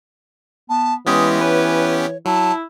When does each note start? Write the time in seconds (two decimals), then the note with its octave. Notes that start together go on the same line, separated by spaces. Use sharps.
0.69 B3 A5
1.07 E3 G#3 B3 C#4 G4 D#6
1.40 B4 C#5
2.26 F#3 E4 A5